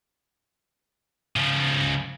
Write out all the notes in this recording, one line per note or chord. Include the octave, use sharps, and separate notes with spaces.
C#3 F3